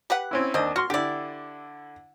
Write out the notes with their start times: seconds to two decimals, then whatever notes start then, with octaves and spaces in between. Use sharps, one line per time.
0.10 G4 B4 F#5
0.31 C4 C#4 E4
0.54 D#2 C4 D4 D#5
0.76 F#4 C6 F6
0.90 D3 E4 G4 D5